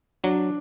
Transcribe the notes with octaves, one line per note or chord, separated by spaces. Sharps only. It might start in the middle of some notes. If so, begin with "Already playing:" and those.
F#3 D4